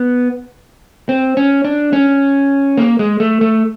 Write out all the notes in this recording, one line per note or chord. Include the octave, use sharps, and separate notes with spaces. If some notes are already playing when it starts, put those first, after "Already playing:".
Already playing: B3
C4
C#4
D4
C#4
A#3
G#3
A3
A3